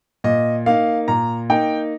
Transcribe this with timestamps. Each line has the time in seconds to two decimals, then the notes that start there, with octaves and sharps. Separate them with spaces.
0.24 A#2 D#5
0.66 A#3 D#4 F5
1.08 A#2 A#5
1.50 A#3 D#4 G5